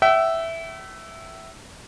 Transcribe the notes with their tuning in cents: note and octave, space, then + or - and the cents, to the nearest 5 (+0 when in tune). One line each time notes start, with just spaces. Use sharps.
E5 +0 G5 -45